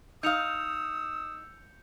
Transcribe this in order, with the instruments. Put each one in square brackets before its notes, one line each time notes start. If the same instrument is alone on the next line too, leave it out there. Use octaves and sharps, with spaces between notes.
[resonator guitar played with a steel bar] D#4 F5 [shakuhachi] D#6 [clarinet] E6 [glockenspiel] G6 C#7 F7